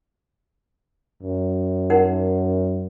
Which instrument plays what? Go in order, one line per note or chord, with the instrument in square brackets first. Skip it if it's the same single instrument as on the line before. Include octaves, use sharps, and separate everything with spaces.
[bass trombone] F#2
[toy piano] D#4 A#4 F#5